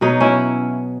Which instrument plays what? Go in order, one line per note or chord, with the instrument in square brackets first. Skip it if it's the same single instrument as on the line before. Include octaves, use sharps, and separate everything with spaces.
[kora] B2 F#3 B3 D#4
C#4 E4